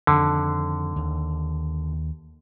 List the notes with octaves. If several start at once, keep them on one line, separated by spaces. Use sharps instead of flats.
F2 D3 D#3
D#2